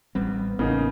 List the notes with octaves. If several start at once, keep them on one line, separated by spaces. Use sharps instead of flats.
A1 G3 B3 C4
A1 C#3 A#3 B3 D#4